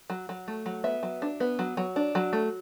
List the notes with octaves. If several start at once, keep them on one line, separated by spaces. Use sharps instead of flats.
F#3
F#3
A3
F#3
B3 E5
F#3
D4
B3
F#3
F#3
D4
F#3
A3